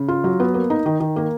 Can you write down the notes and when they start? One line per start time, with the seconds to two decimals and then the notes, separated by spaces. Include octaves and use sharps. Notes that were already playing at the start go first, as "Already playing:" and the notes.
Already playing: C#3
0.08 F4
0.24 F#3
0.40 B3
0.54 A#3
0.70 D#4
0.86 D#3
1.00 D#3
1.16 A#3